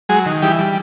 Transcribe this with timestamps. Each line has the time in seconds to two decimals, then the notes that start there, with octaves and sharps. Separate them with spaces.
0.09 F#3 G#3 G#4
0.26 D#3
0.42 E3 G3 G4
0.59 G3